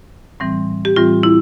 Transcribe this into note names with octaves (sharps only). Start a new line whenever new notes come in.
A2 E3 G3 C4
G4
A2 E3 G3 C4 F4
E4